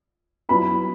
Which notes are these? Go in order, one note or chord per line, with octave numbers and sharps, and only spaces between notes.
F#3 B3 E4 B5